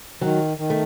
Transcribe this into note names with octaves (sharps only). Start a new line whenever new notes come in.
D#3 F#3
D#3
A3